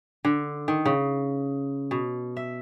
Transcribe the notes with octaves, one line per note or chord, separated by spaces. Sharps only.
D3
D#3
C#3
B2
E5